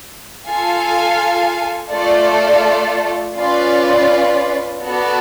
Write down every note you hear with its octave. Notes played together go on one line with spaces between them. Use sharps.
F4 A4 F5 G#5
A3 F4 A4 D5
C#4 F4 B4 D5
B3 F#4 A4 D5